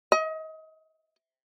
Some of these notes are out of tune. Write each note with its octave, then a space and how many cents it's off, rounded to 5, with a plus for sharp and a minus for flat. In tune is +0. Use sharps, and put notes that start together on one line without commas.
D#5 +30